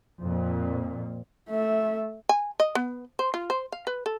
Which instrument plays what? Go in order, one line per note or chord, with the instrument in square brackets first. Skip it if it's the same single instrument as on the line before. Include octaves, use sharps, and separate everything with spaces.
[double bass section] F2 A#2
[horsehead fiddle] A3 E5
[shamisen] G#5
D#5
B3
C5
F4
C5
F5
B4
A4